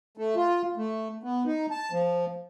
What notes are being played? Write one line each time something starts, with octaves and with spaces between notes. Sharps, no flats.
A3
F4
A3
B3
D#4
A5
F3